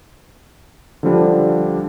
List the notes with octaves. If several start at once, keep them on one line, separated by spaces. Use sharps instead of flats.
D3 F3 G3 D4